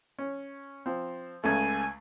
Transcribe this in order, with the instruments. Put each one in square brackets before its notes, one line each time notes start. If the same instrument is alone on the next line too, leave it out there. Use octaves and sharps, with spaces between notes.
[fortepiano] C#4
F3 C4
[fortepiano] C#2 C#3 A3 [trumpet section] G#5